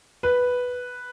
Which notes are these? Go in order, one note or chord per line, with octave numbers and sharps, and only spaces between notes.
B4